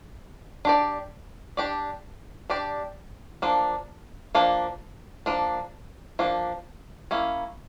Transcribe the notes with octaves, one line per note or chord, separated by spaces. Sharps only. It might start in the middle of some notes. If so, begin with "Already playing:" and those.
D4 G4 D5
D4 G4 D5
D4 G4 D5
F3 A#3 D4
F3 A#3 D4
F3 A#3 D4
F3 A#3 D4
A#3 C#4 E4